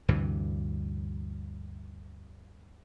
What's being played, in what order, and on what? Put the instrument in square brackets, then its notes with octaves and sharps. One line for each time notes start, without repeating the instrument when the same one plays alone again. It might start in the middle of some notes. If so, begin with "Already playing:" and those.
[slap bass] D2 G2 C3 E3